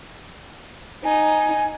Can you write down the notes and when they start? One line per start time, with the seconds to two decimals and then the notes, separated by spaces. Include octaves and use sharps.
1.04 D#4 G#5